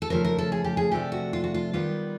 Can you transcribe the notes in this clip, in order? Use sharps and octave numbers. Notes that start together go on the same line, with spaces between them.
A4
C#3 F3 A3 A#4
A#4
A4
G#4
G4
G#4
C3 F3 A3 D4 G4
F#4
F4
F#4
F4
D#3 G3 B3 F4